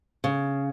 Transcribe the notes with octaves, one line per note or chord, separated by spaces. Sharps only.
C#3